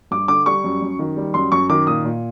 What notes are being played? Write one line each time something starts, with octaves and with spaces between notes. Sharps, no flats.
G2 D6
D3 D6
G3 C#6
F#2
F#2
D#3
G3
F#2 C6
F#2 C#6
D#3 D6
A#2 D#6
A#2